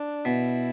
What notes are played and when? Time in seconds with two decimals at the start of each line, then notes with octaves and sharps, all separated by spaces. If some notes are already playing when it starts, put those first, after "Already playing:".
Already playing: D4
0.25 B2 E4